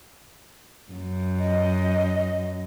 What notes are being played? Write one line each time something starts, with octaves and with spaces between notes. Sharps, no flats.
F#2
D#5